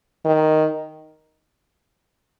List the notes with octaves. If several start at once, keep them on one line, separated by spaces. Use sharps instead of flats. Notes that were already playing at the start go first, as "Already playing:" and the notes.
D#3